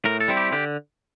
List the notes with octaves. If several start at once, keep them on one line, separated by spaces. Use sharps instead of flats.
A2 A#4
A4
G3 C4 E4
G4
D3 G4